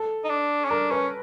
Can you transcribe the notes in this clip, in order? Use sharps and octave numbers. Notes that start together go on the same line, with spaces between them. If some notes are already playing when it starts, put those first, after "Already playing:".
Already playing: A4
D#4
D4
C#4
D4 A#4
C#4 B4